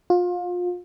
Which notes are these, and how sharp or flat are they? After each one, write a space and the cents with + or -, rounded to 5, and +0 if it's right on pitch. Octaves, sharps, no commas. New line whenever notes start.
F4 +30